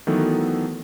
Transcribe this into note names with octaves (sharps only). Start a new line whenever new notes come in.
D#3 E3 F#3 A3 B3 A4